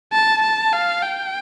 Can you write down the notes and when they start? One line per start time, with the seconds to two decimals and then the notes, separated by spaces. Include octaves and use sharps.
0.13 A5
0.42 A5
0.73 F5
1.03 G5